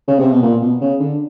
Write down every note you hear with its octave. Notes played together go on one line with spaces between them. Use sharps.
C#3
C3
B2
A#2
B2
C#3
D3